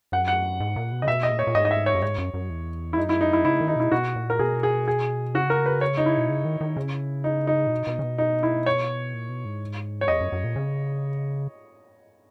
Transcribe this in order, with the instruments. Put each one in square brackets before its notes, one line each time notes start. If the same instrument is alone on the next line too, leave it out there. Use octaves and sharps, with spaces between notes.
[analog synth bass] F#2 [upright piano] F#5
[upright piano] F#5
[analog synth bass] G#2
A#2
B2
[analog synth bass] C#3 [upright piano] D#5
[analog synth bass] B2 [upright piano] E5
[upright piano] D#5
[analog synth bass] A#2
[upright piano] C#5
[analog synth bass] A#2
[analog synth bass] G#2 [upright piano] D#5
[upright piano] D#5
E5
C#5
[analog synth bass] F#2
[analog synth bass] G#2 [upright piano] C#5
[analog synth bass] F#2
F#2
E2
[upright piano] E4
[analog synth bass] F#2 [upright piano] D#4
[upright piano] E4
D#4
E4
[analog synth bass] C#3 [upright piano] E4
[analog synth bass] D#3
[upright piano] D#4
[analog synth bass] B2 [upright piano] E4
[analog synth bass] B2 [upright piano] F#4
[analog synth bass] A#2
[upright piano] A#4
[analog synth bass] B2 [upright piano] G#4
[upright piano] G#4
G#4
[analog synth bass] C#3 [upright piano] F#4
[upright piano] A#4
B4
C#5
D#4
E4
[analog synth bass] B2
C#3
D#3
D#3
C#3
[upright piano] D#4
D#4
[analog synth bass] A#2
B2
B2
C#3
B2
[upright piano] D#4
E4
C#5
[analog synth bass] A#2
B2
G#2
[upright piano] C#5
[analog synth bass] E2 [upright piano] D#5
[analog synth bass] F#2
F#2
A#2
C#3